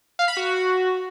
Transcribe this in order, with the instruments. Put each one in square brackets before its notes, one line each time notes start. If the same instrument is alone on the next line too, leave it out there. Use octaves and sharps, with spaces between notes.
[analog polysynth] F5
B5
F#4